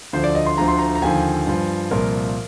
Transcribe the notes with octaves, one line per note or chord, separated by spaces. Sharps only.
D2 D3 F3 C5
D5
D#5
C6
D2 D3 F3 A#5
C6
A#5
A#5
D#2 D3 F3 G#5
G2 F3
C2 A#2 F3 A#4